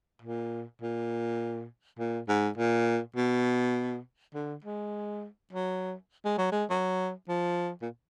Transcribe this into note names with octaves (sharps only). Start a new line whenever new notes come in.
A#2
A#2
A#2
G#2
A#2
B2
D3
G#3
F#3
G#3
F#3
G#3
F#3
F3
A#2